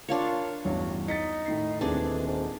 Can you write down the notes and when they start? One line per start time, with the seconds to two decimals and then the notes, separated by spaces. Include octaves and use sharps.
0.09 A#3 D4 F4 C#5
0.65 A1 E2 G2 F#3
1.08 D#4 D#5 A6 B6 C#7
1.46 A2 D#3 C7
1.81 D#1 E3 A3 C4 D4 G#4
2.27 G#2